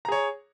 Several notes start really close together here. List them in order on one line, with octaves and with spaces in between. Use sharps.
A#5 G#4 C#5